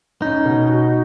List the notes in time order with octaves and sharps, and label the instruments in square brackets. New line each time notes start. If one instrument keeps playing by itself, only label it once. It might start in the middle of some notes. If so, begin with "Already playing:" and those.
[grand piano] C#4 [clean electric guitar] D#4
[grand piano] B2
F#4